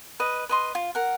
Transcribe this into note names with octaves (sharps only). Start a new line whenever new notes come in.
B4 D#5
B4 D#5 C6
F4
A#4 F#5